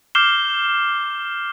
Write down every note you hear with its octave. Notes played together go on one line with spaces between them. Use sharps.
D6 F6 G6 C7 E7 G7